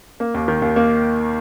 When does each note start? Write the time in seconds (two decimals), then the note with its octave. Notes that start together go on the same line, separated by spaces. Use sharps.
0.20 A#3
0.34 D#2
0.48 D#3
0.62 D#2
0.76 A#3